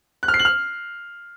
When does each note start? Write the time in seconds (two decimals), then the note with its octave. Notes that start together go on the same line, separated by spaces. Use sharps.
0.23 F#6
0.28 F6
0.34 C7
0.39 F#7
0.45 F6